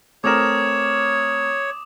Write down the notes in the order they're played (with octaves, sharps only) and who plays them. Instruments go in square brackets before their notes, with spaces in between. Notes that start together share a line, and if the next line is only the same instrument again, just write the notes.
[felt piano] A3 C4 A#4 [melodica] C#5 [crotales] D6 D#6 E7